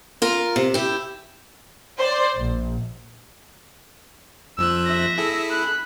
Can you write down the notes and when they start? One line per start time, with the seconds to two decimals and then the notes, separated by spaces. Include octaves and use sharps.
0.22 F4 A#4
0.56 C3
0.74 E4 G4
1.99 C5 D5
2.37 A#1
4.58 F2 F3 E6 F#6
4.87 E5 A#6
5.18 E4 G#4 A4
5.49 B5 F#6